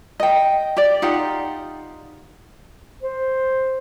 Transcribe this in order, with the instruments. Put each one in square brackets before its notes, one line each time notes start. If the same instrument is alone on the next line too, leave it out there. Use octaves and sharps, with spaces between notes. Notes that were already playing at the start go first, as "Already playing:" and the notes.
[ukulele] D#5 G5
G4 D5
D#4 F4 G4 F#5
[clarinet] C5